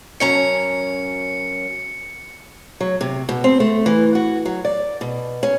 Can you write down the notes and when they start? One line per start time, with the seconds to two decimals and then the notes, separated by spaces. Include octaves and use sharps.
0.20 F#2 C#4 A#5 C#7
2.80 F#3
3.01 C3
3.29 B2
3.44 C4
3.60 A3
3.86 E3
4.15 F#4
4.45 F#3
4.65 D5
5.01 B2
5.43 C#4